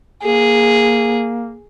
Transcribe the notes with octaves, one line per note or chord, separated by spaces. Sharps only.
A#3 G#4